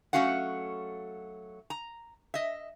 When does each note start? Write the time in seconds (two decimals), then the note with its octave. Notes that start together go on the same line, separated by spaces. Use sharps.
0.13 F#3 A3 C#4 F#4 F5 F#5
1.70 A#5
2.34 D#5 E5